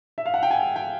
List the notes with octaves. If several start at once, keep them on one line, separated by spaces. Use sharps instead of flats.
E5
F5
F#5
G5
G#5
G5